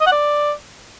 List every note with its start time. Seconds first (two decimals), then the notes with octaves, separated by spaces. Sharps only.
0.01 D#5
0.06 F#5
0.12 D5